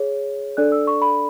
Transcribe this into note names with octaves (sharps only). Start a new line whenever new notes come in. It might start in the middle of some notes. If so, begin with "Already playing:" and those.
Already playing: G#4 C#5
D4 A4 D5 F#6
E6
C#6
B5